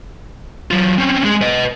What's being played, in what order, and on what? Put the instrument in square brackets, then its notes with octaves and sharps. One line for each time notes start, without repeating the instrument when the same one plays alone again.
[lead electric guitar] F#3 F4
C4 C#4
G#3 G#4
B4 D#5